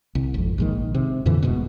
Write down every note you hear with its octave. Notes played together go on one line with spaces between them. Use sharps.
C2
G#1 F2
A#1 G#2 D#3
C3
F2 A#2 D3 E3
D#1 D#2 G#2 B2